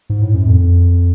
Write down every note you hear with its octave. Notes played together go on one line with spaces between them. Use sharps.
G#2
A2
F#2
F2